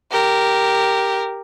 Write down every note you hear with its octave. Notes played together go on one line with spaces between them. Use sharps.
G4 A#4